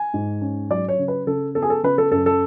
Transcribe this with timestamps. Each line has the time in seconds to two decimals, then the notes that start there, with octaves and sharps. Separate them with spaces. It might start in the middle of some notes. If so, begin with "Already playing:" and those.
Already playing: G#5
0.14 G#2
0.41 C#4
0.70 F#3 D5
0.89 C#5
0.98 C#3
1.08 B4
1.27 C#3 A4
1.55 B3 A4
1.62 G#4
1.70 A4
1.83 C#3 B4
1.98 A4
2.12 F#2 A4
2.26 A4